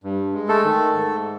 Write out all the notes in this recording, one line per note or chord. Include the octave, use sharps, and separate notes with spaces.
G2
G#3
A3 A4
D#3
G#2